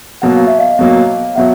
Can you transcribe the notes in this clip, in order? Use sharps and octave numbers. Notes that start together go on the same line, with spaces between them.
B2 F#3 A#3 F#5
F5
E5
D#5 F5
B2 F#3 A#3
B2 F#3 E5 F#5